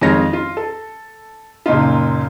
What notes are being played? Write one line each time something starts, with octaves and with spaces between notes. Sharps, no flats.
F2 D#3 G#3 F4 C#5 A#6
F4
A4
F#1 A#2 D#4 F4